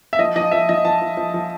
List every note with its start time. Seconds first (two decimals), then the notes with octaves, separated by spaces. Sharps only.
0.13 E5
0.19 F3 D#5
0.36 F3 D#5
0.51 F3 E5
0.69 F3 D#5
0.85 F3 A5
1.02 F3
1.17 F3
1.34 F3